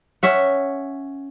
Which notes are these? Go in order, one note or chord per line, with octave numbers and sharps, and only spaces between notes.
C#4 E5 F#5